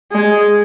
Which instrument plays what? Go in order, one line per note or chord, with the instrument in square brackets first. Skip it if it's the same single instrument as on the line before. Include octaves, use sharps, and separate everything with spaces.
[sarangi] G#3